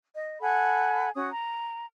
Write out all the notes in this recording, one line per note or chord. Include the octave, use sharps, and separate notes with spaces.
D#5
A4 F#5 G#5 B5
C#4 F#4 D#6
A#5